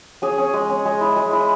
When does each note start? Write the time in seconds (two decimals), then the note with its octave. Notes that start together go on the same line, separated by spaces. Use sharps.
0.22 C#4 G#4
0.38 C#4
0.54 G#3
0.70 C#4
0.85 G#3
1.01 E4
1.16 G#3
1.33 E4